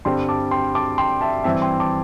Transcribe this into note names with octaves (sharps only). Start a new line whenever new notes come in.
G2 D3 G3 C4 G5 C6
A5 D6
G5 C6
A5 D6
G5 C6
E5 A5
G2 E3 C4 E4 E5 A5
G5 C6
A5 D6